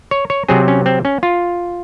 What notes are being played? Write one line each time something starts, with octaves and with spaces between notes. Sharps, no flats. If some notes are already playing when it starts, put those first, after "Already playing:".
C#5
C#5
C3 F#3 C4 G#4
C#4
C4
C#4
F4